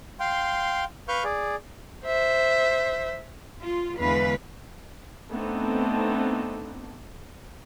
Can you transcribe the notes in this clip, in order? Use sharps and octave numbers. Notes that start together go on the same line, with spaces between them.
F5 G5 C6
B4 F5 C#6 F6 G6
G#4 D5
C5 E5
F4
E2 D3 E3 G#3 B4 F5
A3 B3 C4 D4 D#4 A4